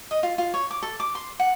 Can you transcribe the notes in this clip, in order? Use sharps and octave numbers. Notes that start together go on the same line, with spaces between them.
D#5
F4
F4
C#5
D6
A4
D6
C6
F#5